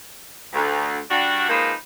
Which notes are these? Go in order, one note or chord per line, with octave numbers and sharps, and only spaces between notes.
D2
G3 D4 F#4
F3 G#3 A#3 D#4 B4 C5